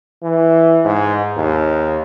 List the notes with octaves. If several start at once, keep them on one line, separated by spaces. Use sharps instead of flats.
E3
G#2
D#2